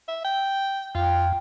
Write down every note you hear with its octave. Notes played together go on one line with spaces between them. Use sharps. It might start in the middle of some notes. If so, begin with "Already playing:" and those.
E5
G5
F2 F4 G5